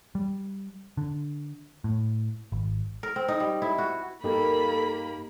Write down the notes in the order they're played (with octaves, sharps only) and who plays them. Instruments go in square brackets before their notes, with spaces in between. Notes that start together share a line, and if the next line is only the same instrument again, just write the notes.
[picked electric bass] G3
D3
A2
G#1
[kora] A#4
C4
D#4
G3
E4
F#4
[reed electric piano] G2 D#4 G4 [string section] A#3 [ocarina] A4 [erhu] B5